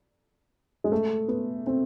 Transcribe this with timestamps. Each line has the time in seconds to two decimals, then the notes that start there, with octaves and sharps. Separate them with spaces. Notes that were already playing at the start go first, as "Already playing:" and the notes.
0.84 G#3
0.92 A3
1.28 B3
1.67 C4